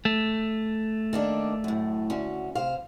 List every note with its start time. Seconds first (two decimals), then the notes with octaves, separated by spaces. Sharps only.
0.05 A3
1.13 D#3 A#3 D4
1.64 F#2 A2
2.10 D2 C#4 F#4
2.55 C3 C5 F5